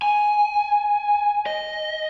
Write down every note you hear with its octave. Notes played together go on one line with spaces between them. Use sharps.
G#5
D#5